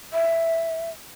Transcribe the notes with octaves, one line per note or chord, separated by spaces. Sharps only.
E5